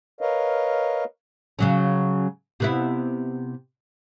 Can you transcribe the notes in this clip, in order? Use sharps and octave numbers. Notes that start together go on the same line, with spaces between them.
A#4 B4 C#5 D#5 F5
C#3 F#3 C#4
C3 B3 E4